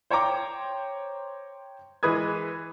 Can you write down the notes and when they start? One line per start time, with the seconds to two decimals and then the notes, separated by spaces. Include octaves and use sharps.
0.10 C5 C#5 G5 A#5 D6
2.03 E3 G#3 B4 D#6 G#6